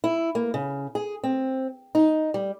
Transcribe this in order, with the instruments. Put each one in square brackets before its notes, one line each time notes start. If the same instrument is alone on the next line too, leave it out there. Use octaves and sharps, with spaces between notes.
[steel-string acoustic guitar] E4
A#3
C#3
G#4
C4
D#4
G3